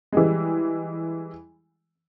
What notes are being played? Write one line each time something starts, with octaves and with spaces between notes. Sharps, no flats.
E3 G3 G#3